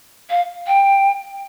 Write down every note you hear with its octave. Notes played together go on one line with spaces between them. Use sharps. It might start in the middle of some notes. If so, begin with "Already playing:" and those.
F5
G5